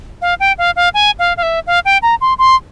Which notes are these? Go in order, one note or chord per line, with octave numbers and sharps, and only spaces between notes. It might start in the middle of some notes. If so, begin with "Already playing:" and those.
F5
G5
F5
F5
G#5
F5
F5
E5
F5
G5
A#5
C6
C6